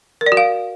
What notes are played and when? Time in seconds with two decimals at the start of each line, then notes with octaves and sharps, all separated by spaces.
0.21 A#4
0.26 D5
0.32 F#4
0.37 F5